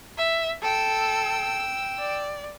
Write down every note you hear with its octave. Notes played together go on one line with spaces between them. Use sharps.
E5
A4 G5 E6
D5